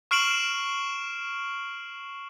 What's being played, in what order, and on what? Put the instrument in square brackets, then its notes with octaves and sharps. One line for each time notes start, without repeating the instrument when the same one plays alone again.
[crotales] C#6 F6 C7 D7 E7 F#7